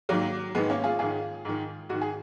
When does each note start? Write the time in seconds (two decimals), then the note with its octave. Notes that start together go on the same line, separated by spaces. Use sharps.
0.09 G#2 D#3 F#3 A#3
0.55 G#2 D#3 G#3 B3
0.70 A#3 C#4
0.84 F4 G#4
0.99 G#2 D#3 F4 G#4
1.45 G#2 D#3
1.89 G#2 D#3 F#4
2.01 G#4